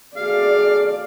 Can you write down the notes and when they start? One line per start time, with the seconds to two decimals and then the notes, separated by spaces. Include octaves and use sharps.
0.17 A3 F#4 G#4 D5 F5